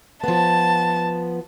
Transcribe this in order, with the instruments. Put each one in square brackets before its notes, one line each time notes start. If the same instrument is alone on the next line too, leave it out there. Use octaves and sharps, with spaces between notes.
[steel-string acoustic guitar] F3 B3 [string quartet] A5